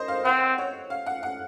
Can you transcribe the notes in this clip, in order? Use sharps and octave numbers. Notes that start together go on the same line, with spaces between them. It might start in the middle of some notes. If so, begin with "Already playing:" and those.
Already playing: A#4 C5 D#5
F5
C4 F#5
C#5
F5
F#5
F#5